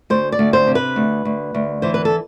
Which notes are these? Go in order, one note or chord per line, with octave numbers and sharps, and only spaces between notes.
D2 C5
D5
D2
C5
C3
B4
D2
D2
D2
E3 C5
B4
A4